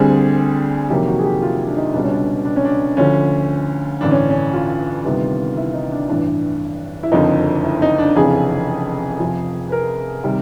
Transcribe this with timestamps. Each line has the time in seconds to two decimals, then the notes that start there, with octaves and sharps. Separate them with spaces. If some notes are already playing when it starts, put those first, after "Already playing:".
Already playing: D2 D3 G3 C4 G#4
0.89 F2 C3 D#3 F#3 A#3 G4
1.07 F#4
1.19 G#4
1.25 G4
1.42 F4
1.67 D4
1.77 D#4
1.94 C#2 B2 G3 D4
2.03 C#4
2.11 D4
2.45 D4
2.56 C#4
2.65 D4
2.97 D2 D3 F3 C#4
4.01 A1 G2 D3 D4
4.11 C#4
4.30 C#4
4.54 F4
5.05 D2 C3 D#3 G3 B3
5.57 E4
5.74 D#4
5.92 D4
6.08 A1 G2 E3 D4
7.03 E4
7.12 F#1 F2 D3 F3 D#4
7.64 E4
7.82 D#4
7.98 D4
8.16 F1 F2 C#3 E3 G#4
9.20 F2 C3 F3
9.68 B4
9.72 A#4
10.24 C3 D#3 G3